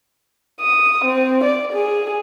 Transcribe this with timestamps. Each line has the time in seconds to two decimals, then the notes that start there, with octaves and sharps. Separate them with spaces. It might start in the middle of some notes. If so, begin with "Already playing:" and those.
0.61 D#6
1.05 C4
1.44 D5
1.73 G#4